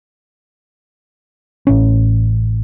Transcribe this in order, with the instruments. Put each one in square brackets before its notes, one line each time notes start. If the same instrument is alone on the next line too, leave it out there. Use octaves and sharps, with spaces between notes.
[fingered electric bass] A1 C#4